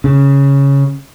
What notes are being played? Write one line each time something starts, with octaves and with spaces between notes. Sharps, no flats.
C#3